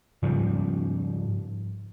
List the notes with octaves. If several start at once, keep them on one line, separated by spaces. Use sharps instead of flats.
G#2 C#3 F3 G3